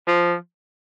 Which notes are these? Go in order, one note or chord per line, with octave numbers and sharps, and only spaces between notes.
F3